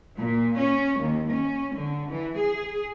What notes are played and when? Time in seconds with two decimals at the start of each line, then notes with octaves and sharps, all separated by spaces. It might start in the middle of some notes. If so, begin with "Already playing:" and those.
0.19 A#2
0.60 C#4
1.00 D#2
1.34 C#4
1.75 D3
2.11 E3
2.40 G#4